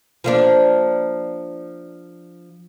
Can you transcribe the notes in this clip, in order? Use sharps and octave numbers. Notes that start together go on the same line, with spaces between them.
F3 A#3 D4